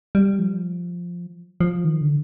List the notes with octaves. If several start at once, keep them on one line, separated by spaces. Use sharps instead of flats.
G3
F3
F3
D#3
D3